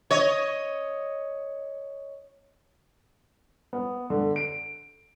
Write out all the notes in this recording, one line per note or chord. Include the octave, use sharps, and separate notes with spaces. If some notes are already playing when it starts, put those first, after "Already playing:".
C#5 D#5
B3
D3
D7